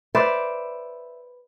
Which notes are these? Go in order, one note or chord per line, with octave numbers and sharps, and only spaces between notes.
B4 C5 D5 E5